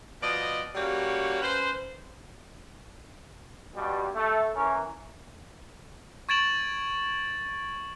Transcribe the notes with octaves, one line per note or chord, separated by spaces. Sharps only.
B2 F3 D5 D#5
C#3 G3 A#3 F#4 C#5
C#4 B4 C5
G2 B2 G3
A3
E3 C#4 A#4
C#6 G#6 A6 D7 E7 F#7